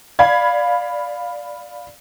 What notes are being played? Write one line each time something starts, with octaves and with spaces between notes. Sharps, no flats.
D5 F5 B5 G#6